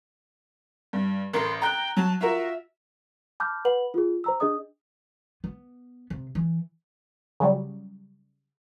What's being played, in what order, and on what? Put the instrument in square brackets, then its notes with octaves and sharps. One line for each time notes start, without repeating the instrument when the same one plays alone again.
[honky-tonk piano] G2
[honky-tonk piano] A1 A#4 A6 [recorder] C6
[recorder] G5 [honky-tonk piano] A#5 F#6
[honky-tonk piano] F#3 [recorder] A5
[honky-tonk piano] F4 F#4 A#4 [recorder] E5
[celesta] A5 B5 D6 F6 G6
B4 F#5 B5 F#7
F4 G#4
C5 A#5 E6
D4 G#4 D#5 D#6
[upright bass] B3
C3
E3
[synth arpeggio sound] C#3 F#3 G3